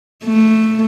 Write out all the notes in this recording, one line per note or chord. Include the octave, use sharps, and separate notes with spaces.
A3